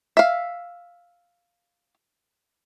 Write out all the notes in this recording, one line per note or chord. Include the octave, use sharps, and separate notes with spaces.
E5 F5